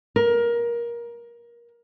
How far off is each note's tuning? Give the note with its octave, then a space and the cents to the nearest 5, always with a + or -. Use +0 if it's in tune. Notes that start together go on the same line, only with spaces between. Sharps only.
A#4 +20